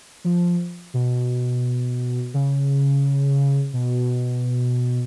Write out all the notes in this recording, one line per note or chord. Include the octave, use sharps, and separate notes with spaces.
F3
B2
C#3
B2